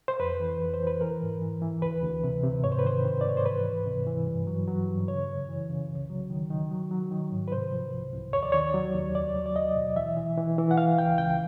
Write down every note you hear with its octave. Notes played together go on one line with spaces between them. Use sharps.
C5
F2 B4
E3
F2
C5
E3
B4
E3 A#4
G#2
E3
E3
D2 B4
D2
C3
C3
G#2 C#5
C5
B4
D#3 C5
D#3
D5
G#2 C#5
C5
E3 B4
D2
C3
E3
G2
F#3
F#3
G2
C#3 C#5
F#2
E3
C#3
C2
F#3
D#3
D#3
F#3
F#3
D#3
G#2
B4
C3 C5
F3
C2
C2
D#2 C#5
D5
D#3 C#5
F#3
D#2
C#2 D5
F#3
D5
C#2 D#5
B2
E3 E5
E3
E3
E3
F#5
E3 F5
C#2 G5
C#2 G5